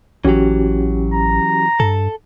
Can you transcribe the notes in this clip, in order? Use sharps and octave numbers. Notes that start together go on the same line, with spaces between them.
A1 E3 F#3 C#4 F#4 G4
A#5
G2 A4